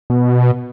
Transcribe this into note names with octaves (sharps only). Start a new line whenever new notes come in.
B2